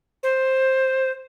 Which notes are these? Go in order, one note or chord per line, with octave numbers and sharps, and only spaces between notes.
C5